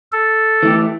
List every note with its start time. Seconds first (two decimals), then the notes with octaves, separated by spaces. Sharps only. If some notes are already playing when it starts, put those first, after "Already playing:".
0.12 A4
0.63 E3 A3 G4